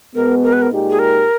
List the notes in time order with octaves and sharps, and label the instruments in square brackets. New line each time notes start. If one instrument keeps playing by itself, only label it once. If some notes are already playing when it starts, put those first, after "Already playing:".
[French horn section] B2 G#3 B3 [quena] A#4
[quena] A#4
B4
A#4
[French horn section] A#2 G#3 D#4 G4
[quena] G#4
A#4